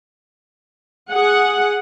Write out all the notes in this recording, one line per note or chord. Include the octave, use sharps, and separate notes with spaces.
G#4 F#5